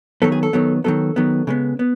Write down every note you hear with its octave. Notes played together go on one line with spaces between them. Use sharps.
D#3 F#3 B3 A4
G#4
A4
D#3 F#3 B3
D#3 F#3 B3 A4
D#3 F#3 B3
C#3 G#3 B3
B3